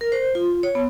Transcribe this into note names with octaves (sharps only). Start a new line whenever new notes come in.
A#4
C5
F4
C#5
B3